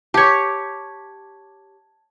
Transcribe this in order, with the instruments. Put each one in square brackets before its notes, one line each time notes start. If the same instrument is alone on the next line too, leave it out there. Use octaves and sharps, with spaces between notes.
[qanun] G4 C#5 [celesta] A5 G#6